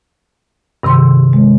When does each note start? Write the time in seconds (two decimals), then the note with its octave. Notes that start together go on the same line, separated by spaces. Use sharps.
0.83 G2 C3 D#3 C6
1.33 G#3